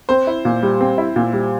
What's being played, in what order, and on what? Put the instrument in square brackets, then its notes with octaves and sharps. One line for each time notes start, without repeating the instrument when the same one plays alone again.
[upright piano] C4 [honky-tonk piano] C5
[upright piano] E4
A#2
G3
C4
E4
A#2
G3